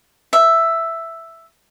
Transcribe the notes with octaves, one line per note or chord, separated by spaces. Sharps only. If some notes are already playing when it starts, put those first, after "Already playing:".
E5